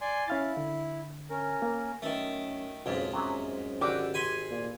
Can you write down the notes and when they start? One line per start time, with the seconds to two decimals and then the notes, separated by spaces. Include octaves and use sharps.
0.01 D5 G#5 C6
0.28 C#4 E4 F5 A6
0.57 D3
1.30 C#4 A#4
1.62 A#3
2.02 F#2 D#3 A3
2.86 B1 F2 G#2 C#3 D#5
3.14 F#2 C3 F#3 G#4
3.81 G#1 D3 F#4 G4 F#5 D6 E6
4.14 G#5 B5 C6
4.50 A#2